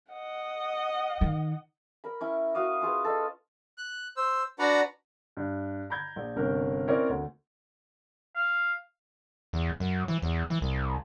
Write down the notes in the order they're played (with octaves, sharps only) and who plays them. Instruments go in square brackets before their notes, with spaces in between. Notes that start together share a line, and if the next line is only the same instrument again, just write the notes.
[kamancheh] D#5 F#5
[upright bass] D#3 D#4
[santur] A#4 B5
C#4 E4
F#4 F5 D#6
C#4 F4 G#4 B4
A4 D#5
[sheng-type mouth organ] F#6
C5 E6
D4 F#4 B4 D5 F#5 A#5
[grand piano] G2
A#5 B5 G6 G#6
A#1
G1 C3 C#4 D4 A#4
C4 C#4 E4 A#4 C#5 D5
D2
[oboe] F5
[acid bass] E2
F#2
E3
E2
E3
C2